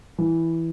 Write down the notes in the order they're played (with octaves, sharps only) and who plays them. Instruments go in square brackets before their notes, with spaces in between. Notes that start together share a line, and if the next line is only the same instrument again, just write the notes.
[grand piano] E3